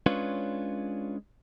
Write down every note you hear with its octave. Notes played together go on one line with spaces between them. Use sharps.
G#3 C#4 D4 F4 B4 C#5